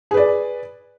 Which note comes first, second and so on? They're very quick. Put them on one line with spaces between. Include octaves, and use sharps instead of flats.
G#4 B4 D5